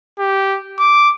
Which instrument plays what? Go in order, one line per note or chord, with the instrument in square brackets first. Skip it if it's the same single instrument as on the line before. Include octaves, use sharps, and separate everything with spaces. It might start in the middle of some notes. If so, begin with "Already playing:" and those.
[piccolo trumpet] G4
D6